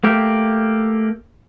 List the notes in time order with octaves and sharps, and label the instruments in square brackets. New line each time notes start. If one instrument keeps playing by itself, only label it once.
[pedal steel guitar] A3 A#3 G4